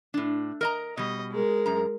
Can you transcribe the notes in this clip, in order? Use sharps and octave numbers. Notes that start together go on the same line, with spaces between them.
A2 D4
A#4 D#5 A#5
B2 G3 D#5
G#3 A#4
F#2 A#5